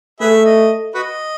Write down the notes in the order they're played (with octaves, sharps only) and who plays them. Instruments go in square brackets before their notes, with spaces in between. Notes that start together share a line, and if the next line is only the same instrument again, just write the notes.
[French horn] A3 [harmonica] G#4 B4 E5
[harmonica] D#5
F#4 B4 D#5